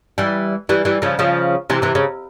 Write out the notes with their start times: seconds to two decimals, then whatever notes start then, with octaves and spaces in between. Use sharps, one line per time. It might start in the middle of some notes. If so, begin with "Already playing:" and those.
0.18 E3 G3
0.69 E3 G3
0.85 E3 G3
1.02 C#3 F3
1.19 C#3 F3
1.70 C3 E3
1.82 C3 E3
1.95 C#3